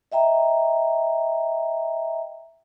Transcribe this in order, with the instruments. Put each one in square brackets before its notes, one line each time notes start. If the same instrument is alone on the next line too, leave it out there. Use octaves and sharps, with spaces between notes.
[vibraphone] D#5 E5 G5 A#5